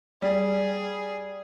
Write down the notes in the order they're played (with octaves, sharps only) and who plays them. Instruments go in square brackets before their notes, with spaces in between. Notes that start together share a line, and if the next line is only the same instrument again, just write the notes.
[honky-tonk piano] G3 [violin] G#4